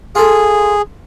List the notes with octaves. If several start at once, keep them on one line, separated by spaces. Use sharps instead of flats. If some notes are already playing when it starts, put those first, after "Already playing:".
F4 G#4 A4